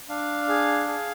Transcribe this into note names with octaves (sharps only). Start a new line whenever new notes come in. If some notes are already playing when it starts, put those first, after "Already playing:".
D4 F5
G#4
G#4